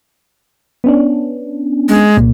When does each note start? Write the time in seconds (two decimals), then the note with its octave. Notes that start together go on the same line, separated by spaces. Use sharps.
0.84 B3 C#4 D4
1.89 G#3
2.17 C2 A#2